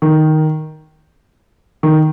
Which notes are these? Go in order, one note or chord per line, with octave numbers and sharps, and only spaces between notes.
D#3
D#3